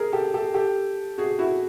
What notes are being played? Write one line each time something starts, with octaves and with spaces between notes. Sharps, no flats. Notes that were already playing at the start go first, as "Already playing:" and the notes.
Already playing: G#4 A#4
G4 A4
G4 A4
G4 A4
F#4 G#4
E4 F#4